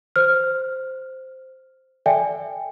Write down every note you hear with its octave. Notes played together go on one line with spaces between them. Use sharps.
C5 F6
A4 D5 E5 G5 G#5